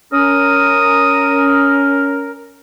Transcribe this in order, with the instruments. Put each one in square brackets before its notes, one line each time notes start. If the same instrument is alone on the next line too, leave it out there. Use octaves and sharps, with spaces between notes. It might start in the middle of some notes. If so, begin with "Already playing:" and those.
[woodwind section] C#4 A#4 [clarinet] D#6